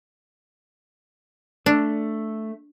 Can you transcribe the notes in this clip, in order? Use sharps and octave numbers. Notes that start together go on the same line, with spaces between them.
A3 D4